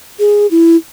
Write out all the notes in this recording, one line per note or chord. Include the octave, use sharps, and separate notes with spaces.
G#4
E4